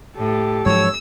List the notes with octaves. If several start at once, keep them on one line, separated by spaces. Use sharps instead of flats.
A2 G4 A4
G#2 F3 F#3 C#5 E6